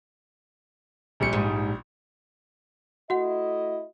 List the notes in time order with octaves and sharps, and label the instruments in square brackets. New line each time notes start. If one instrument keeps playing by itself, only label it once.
[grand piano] A#1 G3 C#7
[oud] G#2
[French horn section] A3 E4 D#5 [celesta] F#4 F#5